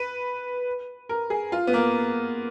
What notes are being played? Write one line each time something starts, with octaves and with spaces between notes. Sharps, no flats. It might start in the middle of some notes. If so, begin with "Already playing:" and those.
Already playing: B4
A#4
G#4
F4
B3
A#3